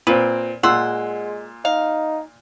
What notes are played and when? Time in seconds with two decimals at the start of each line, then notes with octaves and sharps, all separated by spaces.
0.07 A#2 C4 B4
0.63 A#2 G#3 F#5 C6 E6
1.65 D#4 F5